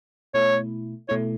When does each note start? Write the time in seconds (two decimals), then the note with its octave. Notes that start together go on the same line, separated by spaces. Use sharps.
0.34 B2 A3 E4 C#5
1.09 B2 A3 E4 C#5